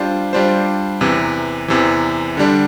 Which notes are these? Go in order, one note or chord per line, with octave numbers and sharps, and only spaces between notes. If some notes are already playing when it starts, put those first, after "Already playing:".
Already playing: G3 D4 F4 C5
G3 D4 F4 C5
E2 C3 E3
E2 C3 E3
D3 G3 D4